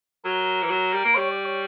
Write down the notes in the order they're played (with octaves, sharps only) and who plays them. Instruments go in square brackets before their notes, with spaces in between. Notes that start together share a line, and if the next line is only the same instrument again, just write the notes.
[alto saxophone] F#3 [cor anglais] A#4
[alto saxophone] E3
F#3
G3
A#3
[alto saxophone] G3 [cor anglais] C#5
[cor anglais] D5
C#5